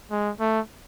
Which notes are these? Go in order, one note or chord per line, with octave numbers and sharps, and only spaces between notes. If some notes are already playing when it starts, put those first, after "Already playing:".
G#3
A3